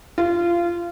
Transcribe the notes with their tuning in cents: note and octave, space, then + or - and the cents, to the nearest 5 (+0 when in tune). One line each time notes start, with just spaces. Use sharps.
F4 -20